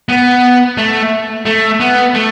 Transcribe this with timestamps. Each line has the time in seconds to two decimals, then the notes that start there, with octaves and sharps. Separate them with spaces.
0.09 B3
0.77 A3
1.46 A3
1.80 B3
2.14 A3